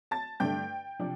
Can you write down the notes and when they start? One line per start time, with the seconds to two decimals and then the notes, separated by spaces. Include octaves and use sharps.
0.11 A5 A6
0.40 G2 D3 A3 D4 G5 G6
0.99 C3 F3 D4